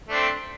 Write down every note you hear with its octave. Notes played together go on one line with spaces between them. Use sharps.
A3 C4 D4